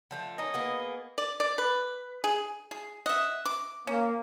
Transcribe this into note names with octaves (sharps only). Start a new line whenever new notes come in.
D3 F3 A3
A#3 C#4 D#4 D#5
A#3 B3 G#4
D5
D5
B4
G#4
G#4
D#5 E5 F#5
D6
A#3 C#4